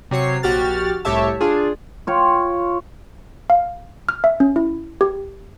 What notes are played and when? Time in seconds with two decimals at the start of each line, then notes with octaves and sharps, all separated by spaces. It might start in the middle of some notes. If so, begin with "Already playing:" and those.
0.11 C3 F#3 C#5 C7
0.43 A#1 F#4 G4 F6 A6
1.05 C2 A2 G4 C#5 E5 A5
1.40 D4 F4 G#4
2.07 F4 C#5 G5
3.50 F5
4.09 F6
4.24 E5
4.40 C#4
4.56 E4
5.01 G4